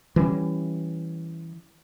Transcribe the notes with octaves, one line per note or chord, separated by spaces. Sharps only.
E3 G3 C#4